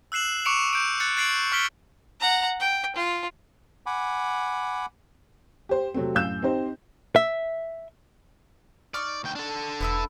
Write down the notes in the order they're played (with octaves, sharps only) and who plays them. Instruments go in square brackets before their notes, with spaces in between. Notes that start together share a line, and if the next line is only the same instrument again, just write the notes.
[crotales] E6 F#6 C7 E7 F#7
C#6 D6 C#7 D7 E7 F7
G6 D7
F#6 A6 C#7
F#6 A6 C7 D7 F#7
C#6 F6 B6 D7 G7
[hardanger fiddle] F#5 A#5
G5
F4
[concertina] F#5 G#5 B5 D6
[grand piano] G4 C5
C3 F#3 A3 C4
F#2 A2 F5 E6 G6 E7
C4 D#4 G4 C5
[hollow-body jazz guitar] E5
[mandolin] D#4 C#6 F6 [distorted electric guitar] D5
[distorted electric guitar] D2 G5
D4 A4
[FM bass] E1 [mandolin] B3 E4 E6